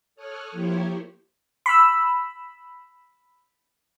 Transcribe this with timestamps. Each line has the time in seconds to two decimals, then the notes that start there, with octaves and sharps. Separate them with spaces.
0.16 A4 C#5 D#6 F6 F#6
0.51 F3 A#3 E4 G4 C5 C#5
1.66 B5 E6